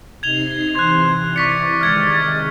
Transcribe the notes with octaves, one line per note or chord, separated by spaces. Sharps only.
C3 D#4 G#6 C7 F7 G7
C3 E3 C5 F#6 G#6
D5 C#6 B6 C#7
C3 D#3 G#3 F6 G#6 C#7